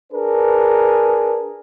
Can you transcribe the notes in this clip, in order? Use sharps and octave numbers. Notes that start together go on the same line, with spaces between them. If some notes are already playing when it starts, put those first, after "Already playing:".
D4 G#4 A#4 B4